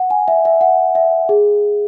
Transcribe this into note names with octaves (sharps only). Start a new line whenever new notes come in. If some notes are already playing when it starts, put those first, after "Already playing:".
Already playing: F#5
G#5
E5
E5
F#5
E5
G#4